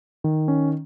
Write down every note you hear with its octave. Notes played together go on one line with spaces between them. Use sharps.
D#3
C#4